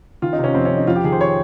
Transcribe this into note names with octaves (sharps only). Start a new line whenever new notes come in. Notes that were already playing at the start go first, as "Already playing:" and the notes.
D#3 F4
D#4
C3
C#4
F2 C4
C#4
F2
D#4
F2 F4
G4
D#3 G#4
C5
C#5